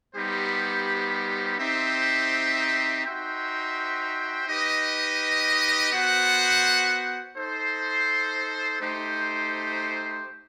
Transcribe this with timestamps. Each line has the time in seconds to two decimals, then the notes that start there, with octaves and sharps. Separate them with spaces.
0.14 G3 B3 D#4 G4 C5
1.59 C4 D#4 G4 C5 E5
3.04 D#4 F#4 C5 E5 G5
4.48 D#4 G4 B4 D#5
5.93 B3 F#4 C5 F#5
7.37 D#4 A4 C5
8.80 A3 D#4 G4 C5